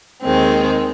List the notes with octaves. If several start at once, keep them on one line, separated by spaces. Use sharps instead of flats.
D#2 D#3 G#3 C4